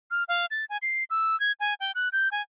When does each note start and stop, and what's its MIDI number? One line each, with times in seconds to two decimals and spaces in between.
0.11 0.24 89
0.28 0.46 77
0.51 0.65 93
0.70 0.77 80
0.82 1.04 96
1.10 1.38 88
1.40 1.52 92
1.60 1.74 80
1.80 1.92 79
1.95 2.09 90
2.13 2.29 91
2.32 2.42 80